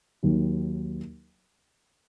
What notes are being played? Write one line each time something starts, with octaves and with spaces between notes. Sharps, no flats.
D#2 D#3 F#3